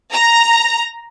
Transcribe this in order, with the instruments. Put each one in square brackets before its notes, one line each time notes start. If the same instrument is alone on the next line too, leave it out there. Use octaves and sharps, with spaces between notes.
[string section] A#5